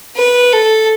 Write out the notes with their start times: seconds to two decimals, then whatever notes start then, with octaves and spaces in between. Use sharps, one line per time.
0.16 B4
0.53 A4